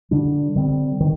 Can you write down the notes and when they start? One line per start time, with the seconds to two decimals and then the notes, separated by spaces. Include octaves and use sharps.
0.11 D3 G3 D4
0.56 D3 G3 C4
1.00 D#3